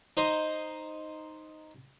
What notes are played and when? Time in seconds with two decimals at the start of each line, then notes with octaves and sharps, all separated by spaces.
0.17 D#4 C5 D#5